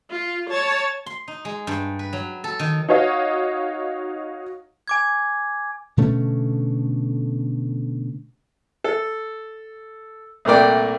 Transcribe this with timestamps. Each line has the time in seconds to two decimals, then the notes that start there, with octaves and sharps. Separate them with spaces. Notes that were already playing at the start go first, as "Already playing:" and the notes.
0.10 F4
0.49 C#5 A5
1.06 C6
1.28 D#4
1.45 G#3
1.67 G2
1.99 B4
2.13 F#3
2.44 A4
2.59 D#3
2.89 D#4 F#4 C#5 D#5 F5
4.88 G#5 D6 G#6
5.97 B2 D3 A3 C#4
8.84 A4
10.45 C2 A#2 A3 A#4 D5 G5